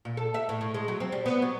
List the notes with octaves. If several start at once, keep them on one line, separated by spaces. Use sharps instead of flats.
A#2
A4
E5
A2
A2
G#3
F#3
C4
G3
B3
F#3